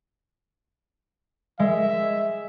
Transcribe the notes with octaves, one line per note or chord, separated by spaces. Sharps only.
G#3 E5